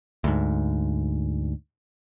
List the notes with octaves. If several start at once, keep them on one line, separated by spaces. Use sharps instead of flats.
D2 G#2